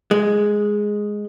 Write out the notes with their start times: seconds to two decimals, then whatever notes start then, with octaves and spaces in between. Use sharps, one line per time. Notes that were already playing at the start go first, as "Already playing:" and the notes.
0.11 G#3